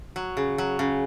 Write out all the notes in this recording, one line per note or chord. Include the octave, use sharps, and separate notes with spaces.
F#3
C#3
F#3
C#3